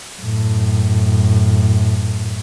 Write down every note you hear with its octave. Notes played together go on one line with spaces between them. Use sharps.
F#2 A2